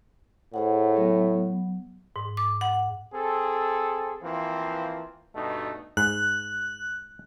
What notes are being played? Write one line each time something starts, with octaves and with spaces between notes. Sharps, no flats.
A2 G#4 C5 F#5
F#3 B3
G#2
D6
F#5
C4 G#4 A4
E3 F3 A#3 C4
G2 B2 A3 D#4
G#2 F#6